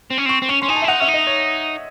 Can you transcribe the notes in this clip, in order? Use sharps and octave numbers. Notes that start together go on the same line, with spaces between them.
C4
C#4
C4 C#6
C4
C#4 C#6
C#4 C6
D#4 G#5
A5
E4 E5
D#4 F#5
C#4 E5
D#4
D#5
C#5